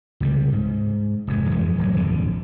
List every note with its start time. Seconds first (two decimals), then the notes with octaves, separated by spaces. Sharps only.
0.20 C#2 C3 G3
0.52 G#2
1.27 F1 G#2 G#3
1.49 F2 E3 F#3 G#3
1.78 D1 F#3 G#3
1.93 D#1 G#1 F2 D3